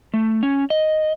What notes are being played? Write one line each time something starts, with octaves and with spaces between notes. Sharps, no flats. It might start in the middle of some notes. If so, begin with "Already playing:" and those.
A3
C#4
D#5